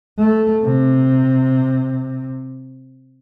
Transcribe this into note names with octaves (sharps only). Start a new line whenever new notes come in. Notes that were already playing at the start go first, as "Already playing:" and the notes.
A3
C3